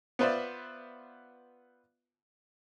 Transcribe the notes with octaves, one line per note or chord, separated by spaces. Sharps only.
B3 F4 B4 C5 D5 E5